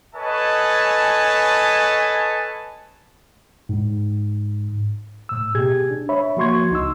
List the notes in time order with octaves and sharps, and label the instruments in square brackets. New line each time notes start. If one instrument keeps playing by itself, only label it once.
[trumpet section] A4 B4 C#5 D#5 G#5 A5
[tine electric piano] G#2
[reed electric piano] A2 E6
B2 G4 G#4 G#6
D4
C#5 E5 B5
F3 A#3 F#4 C6 C#6 G#6
C#2 D#4 C6 E6